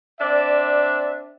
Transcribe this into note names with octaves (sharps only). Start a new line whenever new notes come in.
C4 D4 D5 E5